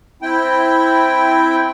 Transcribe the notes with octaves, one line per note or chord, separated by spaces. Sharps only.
C4 E4 G5